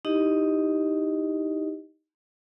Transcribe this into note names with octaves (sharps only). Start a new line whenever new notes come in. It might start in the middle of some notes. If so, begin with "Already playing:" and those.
D#4 E4 G4 D#5